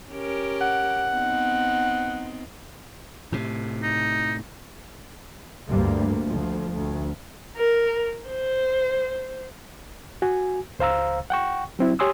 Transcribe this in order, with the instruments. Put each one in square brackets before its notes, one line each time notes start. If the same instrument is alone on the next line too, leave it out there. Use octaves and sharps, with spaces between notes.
[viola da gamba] C#4 G4 A#4
[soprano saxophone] F#5
[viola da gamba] B3 C4 D#4
[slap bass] A2 C3
[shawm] D#4
[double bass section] D2 G2 G3 A#3
D2 F3
D2
[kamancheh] A#4
C5
[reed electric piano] F#4 G#5
C#2 C5 F5 A#5 E6
F#5 G5 C#6
F#3 C4 E4
G4 C#5 G#5 C6 D#6 E6